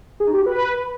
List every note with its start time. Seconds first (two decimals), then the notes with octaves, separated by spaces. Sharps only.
0.20 G#4
0.27 D#4
0.33 G4
0.40 F#4
0.46 B4